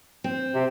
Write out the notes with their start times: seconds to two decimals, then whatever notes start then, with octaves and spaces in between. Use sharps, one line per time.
0.24 C4
0.55 C3